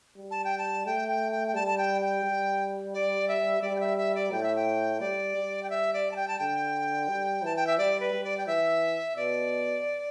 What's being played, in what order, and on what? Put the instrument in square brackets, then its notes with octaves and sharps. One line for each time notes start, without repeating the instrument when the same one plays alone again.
[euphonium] G3
[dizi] A5
G5
A5
[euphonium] A3 [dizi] G5
[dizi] G5
G5
G5
[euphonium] G3 [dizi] A5
[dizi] A5
G5
G5
[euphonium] G3
[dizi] D5
E5
[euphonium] G3 [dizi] D5
[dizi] G5
E5
E5
D5
[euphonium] A2 [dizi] G5
[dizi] E5
G5
[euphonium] G3 [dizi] D5
[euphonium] G3
[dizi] G5
E5
D5
A5
G5
A5
[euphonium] D3 [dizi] G5
[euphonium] G3
[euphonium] E3 [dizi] A5
[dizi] G5
E5
[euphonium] G3 [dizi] D5
[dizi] B4
[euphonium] G3
[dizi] D5
G5
[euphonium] E3 [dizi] E5
[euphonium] B2 [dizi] D5